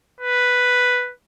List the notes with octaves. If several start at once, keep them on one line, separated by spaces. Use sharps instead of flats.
B4